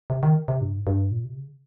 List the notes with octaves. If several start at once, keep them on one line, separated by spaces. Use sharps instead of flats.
C3
D#3
C3
G2
G#2
G2
A#2
C3
C#3